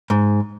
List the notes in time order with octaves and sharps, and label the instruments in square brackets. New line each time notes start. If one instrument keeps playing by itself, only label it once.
[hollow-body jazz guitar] G#2